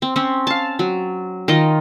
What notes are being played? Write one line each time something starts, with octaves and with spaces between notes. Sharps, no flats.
C4
C4 C#4
F5 A5
F#3
D#3 F4 D#5